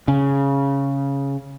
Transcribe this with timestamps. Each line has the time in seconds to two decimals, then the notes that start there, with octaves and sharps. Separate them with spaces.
0.08 C#3